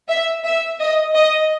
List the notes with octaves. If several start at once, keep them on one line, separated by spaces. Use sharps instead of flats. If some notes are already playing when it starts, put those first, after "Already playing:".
E5
E5
D#5
D#5